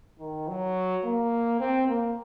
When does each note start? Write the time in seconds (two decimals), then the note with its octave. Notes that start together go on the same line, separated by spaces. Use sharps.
0.20 D#3
0.48 F#3
1.05 A#3
1.60 C4
1.88 A#3